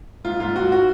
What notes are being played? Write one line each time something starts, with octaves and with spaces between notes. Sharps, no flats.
G#2 F4
G#2 F4
G#2 F#4
F#4